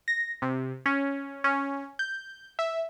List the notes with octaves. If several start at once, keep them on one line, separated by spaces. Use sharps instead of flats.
A#6
C3
C#4
C#4
G6
E5